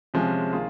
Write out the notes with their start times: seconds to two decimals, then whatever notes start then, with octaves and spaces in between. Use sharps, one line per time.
0.14 C3 F3 G#3 C#4
0.53 D#3 A#3 F4 G#4